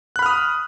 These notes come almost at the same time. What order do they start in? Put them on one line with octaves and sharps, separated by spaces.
F#6 B5 F6 D#6